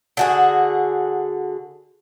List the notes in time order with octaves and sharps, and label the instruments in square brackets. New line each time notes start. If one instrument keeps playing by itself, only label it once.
[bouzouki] D3 F#4 G#4